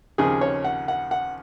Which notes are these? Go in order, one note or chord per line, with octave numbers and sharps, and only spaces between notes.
D#2 C#3 F3 C4 G#4
C#5
F#5
F#5
F#5